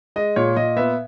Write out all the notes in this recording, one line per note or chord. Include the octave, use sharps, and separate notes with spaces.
G#3 D#5
A#2 C#5
A#2 D#5
B3 E5